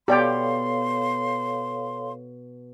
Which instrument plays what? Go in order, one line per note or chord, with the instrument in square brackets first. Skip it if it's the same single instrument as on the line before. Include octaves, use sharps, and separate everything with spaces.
[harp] B2 [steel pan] G4 D5 G5 [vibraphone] A4 C#5 F5 [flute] C6